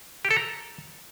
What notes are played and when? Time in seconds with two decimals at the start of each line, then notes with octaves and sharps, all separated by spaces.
0.25 G4
0.31 A4
0.36 A#5